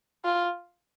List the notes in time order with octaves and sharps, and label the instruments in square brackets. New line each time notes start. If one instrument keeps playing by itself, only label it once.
[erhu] F4